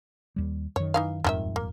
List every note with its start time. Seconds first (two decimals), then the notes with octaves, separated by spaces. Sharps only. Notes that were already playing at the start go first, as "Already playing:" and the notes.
0.36 D#2 G3
0.76 F#2 D#3 C#5
0.94 E3 D#4 F5
1.24 D#1 F2 G#2 D#3 F#4 E5
1.56 A#3